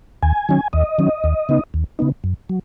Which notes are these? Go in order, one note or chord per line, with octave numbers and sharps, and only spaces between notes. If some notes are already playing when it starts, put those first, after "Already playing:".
D#2 G#5
D#3 F#3 C#4
D#2 D#5
D#3 F#3 C#4
D#2
C#3 B3 D#4
D#2
C#3 B3 D#4
F#2
F#3